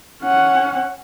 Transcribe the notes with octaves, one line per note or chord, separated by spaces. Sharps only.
C#4 F#5